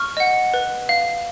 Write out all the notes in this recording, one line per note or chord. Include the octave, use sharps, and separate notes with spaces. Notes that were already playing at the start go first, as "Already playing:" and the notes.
Already playing: C#6 F6
D#5 F#5
B4
F5